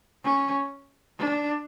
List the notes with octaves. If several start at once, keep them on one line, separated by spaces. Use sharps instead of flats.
C#4
D4